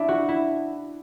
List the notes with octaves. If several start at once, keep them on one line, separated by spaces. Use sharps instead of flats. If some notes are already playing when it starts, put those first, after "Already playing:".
Already playing: D4 E4
F#4
E4